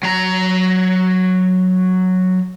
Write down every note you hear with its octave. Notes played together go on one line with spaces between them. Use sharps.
F#3 A#5